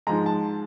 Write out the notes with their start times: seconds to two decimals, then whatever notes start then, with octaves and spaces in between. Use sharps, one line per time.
0.07 G#2 F3 G#3 A#5
0.26 A5